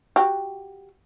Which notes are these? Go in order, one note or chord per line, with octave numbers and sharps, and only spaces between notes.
F#4 G4